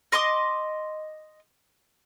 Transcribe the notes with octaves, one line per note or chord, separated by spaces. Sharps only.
D#5 C6 D6 D#6